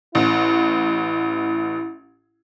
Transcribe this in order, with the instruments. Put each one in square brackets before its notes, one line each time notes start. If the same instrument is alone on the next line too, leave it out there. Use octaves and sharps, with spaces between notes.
[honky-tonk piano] A1 [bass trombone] E4